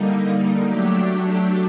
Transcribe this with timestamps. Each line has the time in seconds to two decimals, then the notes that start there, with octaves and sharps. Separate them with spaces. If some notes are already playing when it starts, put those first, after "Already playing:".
Already playing: D3 G3 A#3 D#4
0.63 F#3 A3 D4 G4